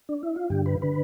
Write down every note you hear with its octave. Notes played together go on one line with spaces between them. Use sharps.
D4
E4
F4
G2 D3 G4
B4
D3 B4